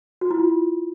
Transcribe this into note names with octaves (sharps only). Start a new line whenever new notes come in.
F#4
E4
F4